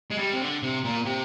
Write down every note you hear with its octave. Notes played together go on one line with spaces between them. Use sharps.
G#3
G3
C3
D3
C3
A#2
C3